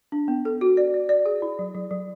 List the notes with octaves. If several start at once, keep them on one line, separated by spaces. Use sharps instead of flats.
D4
B3
A4
F#4
D5
D5
D5
G#4
E4
F#3
F#3
F#3